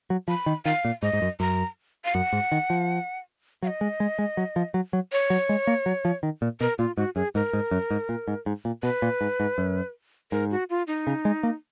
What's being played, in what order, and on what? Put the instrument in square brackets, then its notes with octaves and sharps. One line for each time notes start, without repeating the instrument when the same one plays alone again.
[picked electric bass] F#3
[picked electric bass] F3 [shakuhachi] B5
[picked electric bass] D#3
[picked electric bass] D#3 [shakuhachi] F5
[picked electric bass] A#2
[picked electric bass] G#2 [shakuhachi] D#5
[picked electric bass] G#2
F#2
[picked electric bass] F#2 [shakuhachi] A#5
[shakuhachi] F5
[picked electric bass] F#2 [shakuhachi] F#5
[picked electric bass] G#2
D#3
F3
[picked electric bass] F#3 [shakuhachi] F5
[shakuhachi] D#5
[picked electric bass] G#3
G#3
G#3
F#3
F3
F#3
F#3
[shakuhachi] C#5
[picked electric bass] F#3
G#3
A#3
F#3
F3
D#3
A#2
[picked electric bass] B2 [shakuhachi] A#4
[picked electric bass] A#2 [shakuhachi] F4
[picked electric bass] G#2 [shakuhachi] F#4
[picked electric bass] F#2 [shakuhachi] G#4
[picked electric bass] G#2 [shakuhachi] A#4
[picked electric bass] G#2
F#2
G#2
A#2
G#2
G#2
A#2
[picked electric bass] B2 [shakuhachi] B4
[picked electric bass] A#2
G#2
G#2
F#2
[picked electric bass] G#2 [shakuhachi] A#4
[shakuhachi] F#4
F4
D#4
[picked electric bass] C#3
G#3
A#3